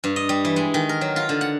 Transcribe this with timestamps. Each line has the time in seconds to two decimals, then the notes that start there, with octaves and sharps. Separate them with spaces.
0.04 G2
0.16 D#5
0.29 G3
0.45 E3
0.56 G#3
0.74 D#3
0.89 A#4
1.01 F#3
1.16 F4
1.29 D3
1.41 F#5